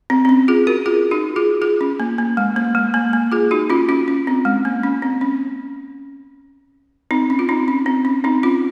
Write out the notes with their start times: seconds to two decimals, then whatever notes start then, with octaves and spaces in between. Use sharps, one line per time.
0.10 C4
0.25 C4
0.29 C#4
0.48 F4 G#4
0.67 F#4 A#4
0.86 F4 G#4
1.11 D#4 F#4
1.36 F4 G#4
1.62 F4 G#4
1.81 C#4
2.00 A#3
2.18 A#3
2.37 G#3
2.56 A#3
2.75 G#3
2.94 A#3
3.13 A#3
3.32 F4 G#4
3.51 D#4 F#4
3.70 C#4 F4
3.89 C#4 F4
4.08 C#4
4.27 C4
4.45 G#3
4.65 A#3
4.83 C#4
5.02 C4
5.21 C#4
7.11 C4 D#4
7.30 C#4
7.39 F4
7.49 C4 D#4
7.68 C#4
7.86 C4
8.05 C#4
8.24 C4 D#4
8.43 C#4 F4